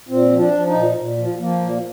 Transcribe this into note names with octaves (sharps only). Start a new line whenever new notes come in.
A#2 C4
F3
D4
F3
D#4
A#2
A#2
F3
F3 A#3
A#2